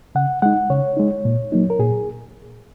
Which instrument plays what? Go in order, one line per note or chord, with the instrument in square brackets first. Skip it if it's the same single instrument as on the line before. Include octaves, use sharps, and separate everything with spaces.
[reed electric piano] C#3 F#5
G#3 D#4 F#5
C#3 C#5
G#3 D#4
A#2
F#3 A#3 D#4
A#4
A#2 G#4